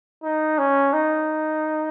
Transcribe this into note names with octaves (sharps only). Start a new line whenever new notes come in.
D#4
C#4
D#4